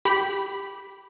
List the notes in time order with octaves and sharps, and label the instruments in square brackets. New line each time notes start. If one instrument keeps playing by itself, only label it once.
[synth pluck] G4 B5